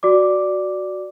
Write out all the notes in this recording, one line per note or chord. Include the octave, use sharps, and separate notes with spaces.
F#4 D5 D6